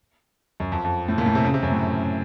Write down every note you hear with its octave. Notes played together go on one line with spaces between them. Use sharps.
F#2
F2
F2
A2
A#2
A2
C3
C#3
C3
F#2
A2